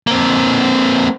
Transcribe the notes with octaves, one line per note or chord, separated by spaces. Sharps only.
A#3 C4